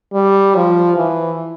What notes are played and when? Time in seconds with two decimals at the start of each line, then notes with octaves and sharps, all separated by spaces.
0.13 G3
0.55 F3
0.96 E3